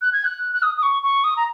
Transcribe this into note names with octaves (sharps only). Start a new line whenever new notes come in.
F#6
G#6
F#6
F#6
D#6
D#6
C#6
C#6
D#6
A#5